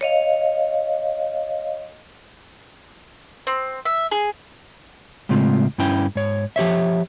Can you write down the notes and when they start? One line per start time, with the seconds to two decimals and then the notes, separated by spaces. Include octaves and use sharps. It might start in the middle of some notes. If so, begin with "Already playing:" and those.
0.01 C#5 D#5 F5
3.47 C4
3.85 E5
4.11 G#4
5.29 A2 C#3 G#3 C4 F4
5.78 G2 C#4 E4 G5
6.15 G#2 C#5
6.56 F3 G4 C#5 E5